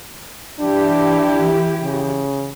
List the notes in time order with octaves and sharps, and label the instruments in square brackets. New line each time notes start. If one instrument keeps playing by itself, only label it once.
[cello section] E3 E4 G4 [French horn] D4
[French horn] C#3